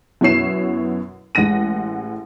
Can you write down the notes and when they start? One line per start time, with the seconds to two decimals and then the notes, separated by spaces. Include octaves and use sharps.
0.21 F#2 B2 E4 C#5 C7 E7
1.35 A1 G#3 F#5 A#6 D#7